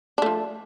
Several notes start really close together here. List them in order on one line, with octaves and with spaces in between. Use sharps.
D4 A3 F3